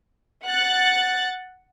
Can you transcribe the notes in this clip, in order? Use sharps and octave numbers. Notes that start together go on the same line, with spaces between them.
F#5 F#6 A6